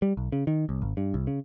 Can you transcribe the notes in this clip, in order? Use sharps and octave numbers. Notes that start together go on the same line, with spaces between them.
G3
B1
C#3
D#3
C2
G#1
G2
C2
C#3